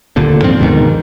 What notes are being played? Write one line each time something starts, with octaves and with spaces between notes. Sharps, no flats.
D#1 D2 A#2 D3
G#2 F3 C4
D2 G#2 B2 D#3